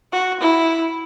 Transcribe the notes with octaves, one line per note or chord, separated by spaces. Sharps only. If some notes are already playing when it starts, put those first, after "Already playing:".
F#4
E4